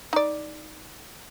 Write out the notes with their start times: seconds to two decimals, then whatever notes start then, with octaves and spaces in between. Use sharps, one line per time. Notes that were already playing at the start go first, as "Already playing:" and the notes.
0.13 D#4 D5